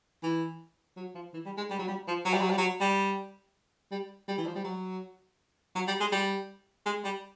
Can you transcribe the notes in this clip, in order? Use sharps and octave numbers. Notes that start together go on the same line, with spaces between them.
E3
F#3
F3
E3
G3
G#3
G3
F#3
G3
F3
F#3
G3
F#3
G3
F#3
G3
G3
G3
E3
F3
G3
F#3
F#3
G3
G#3
G3
G#3
G3